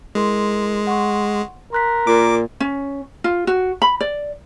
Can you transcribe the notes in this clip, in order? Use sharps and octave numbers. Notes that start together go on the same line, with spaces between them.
G#3 E4 A#4 C6
F#5 C6 C#6
A#4 C6 F#6 B6
A#2 D6
C#4
F4
F#4
B5
D5